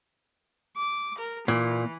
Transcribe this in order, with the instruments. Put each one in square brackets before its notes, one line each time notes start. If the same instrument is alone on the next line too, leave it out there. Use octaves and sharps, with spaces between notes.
[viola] D6
A#4
[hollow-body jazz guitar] A#2 [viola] E3